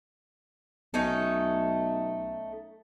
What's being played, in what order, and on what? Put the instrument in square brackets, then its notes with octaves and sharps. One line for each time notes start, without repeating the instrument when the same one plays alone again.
[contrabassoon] B1 [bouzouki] A3 C#4 D#4